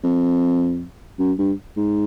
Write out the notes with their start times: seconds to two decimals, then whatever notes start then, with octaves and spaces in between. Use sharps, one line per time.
0.04 F2
1.19 F#2
1.38 G2
1.76 G#2